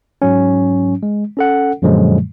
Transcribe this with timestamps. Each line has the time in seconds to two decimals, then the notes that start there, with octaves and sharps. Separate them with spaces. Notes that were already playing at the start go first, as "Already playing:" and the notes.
0.22 G#2 F#3 C#4
1.03 G#3
1.37 C#4 A4 F#5
1.82 F#2 A#2 D3 F3 F#3 G#3